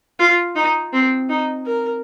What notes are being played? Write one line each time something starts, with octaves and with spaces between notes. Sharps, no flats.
F4
D#4
C4
D#4
A#4